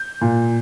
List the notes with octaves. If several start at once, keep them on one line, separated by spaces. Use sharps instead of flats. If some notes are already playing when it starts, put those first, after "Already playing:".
Already playing: G6
A#2